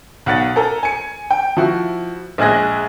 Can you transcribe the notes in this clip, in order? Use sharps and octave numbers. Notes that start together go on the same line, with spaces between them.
B1 F#5 A6
A4 A#4 G#5 A#5
G#5 C#7
G5
F3 E4 F#4
A#1 G#3 G#4 F#6 A#6